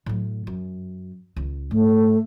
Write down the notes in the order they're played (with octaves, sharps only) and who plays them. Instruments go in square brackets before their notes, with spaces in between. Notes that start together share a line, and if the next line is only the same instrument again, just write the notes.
[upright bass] A2 F#3
F#2
C#2
[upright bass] G#2 [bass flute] A3